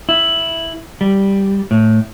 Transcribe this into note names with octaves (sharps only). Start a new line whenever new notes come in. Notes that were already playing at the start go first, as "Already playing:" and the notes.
E4
G3
A2